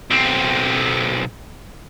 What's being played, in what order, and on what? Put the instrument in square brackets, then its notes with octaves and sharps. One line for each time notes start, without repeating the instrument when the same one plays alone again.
[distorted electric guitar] B1 C4